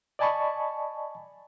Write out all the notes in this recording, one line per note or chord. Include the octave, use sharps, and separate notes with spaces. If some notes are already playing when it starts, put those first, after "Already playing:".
D5 D#5 G#5 A5 B5 C#6